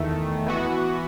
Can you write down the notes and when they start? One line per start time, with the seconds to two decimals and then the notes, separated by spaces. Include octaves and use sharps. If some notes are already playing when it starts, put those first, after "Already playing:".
Already playing: E2 D#3 A3
0.46 E3 B3 F#4